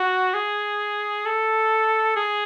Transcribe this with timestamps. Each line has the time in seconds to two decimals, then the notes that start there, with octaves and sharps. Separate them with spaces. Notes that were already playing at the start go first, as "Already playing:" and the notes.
Already playing: F#4
0.34 G#4
1.25 A4
2.16 G#4